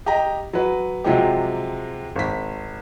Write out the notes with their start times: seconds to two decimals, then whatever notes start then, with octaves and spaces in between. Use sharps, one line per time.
0.06 G4 D#5 A#5
0.53 F#3 B4
1.04 C3 F3 F#3 G#3 G4
2.16 G#1 B6